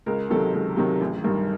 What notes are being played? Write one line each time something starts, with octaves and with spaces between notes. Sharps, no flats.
C#2 A#4
C3 D#3 F#3 A4
C#2
C3 D#3 F#3
A1
G2 D#3